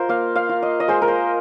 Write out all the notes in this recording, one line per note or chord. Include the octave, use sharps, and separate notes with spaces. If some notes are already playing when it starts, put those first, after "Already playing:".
Already playing: F4 A#4 C5 D#5
A#3 F5
F5
F4
D#5
D#5
G#3 C5
A#4
C5